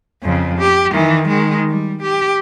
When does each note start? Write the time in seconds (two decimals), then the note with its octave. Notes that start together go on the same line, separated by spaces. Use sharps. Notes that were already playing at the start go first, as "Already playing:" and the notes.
0.23 F2 C#3
0.59 G4
0.91 D#3 E3
1.28 D#3 G#3
1.68 G3
2.02 G4